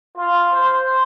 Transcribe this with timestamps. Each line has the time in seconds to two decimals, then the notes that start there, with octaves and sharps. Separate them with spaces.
0.17 F4
0.52 C5